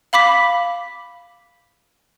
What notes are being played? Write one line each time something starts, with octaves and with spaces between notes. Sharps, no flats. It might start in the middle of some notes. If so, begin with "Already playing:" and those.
F5 B5 D6 B6